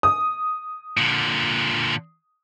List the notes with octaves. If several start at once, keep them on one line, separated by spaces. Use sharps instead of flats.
D#6
A#2 D3